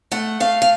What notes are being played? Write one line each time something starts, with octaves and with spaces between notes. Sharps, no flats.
A3 F#5
A3 F5
F5